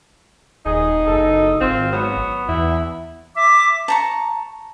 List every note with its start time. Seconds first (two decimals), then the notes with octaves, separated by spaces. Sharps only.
0.66 D#1 D#4 G#4
1.07 F#1 A4
1.61 G#1 C4 F4
1.93 F#3 B3
2.49 E2 E4
3.36 E5 D6
3.88 A5 A#5 C#6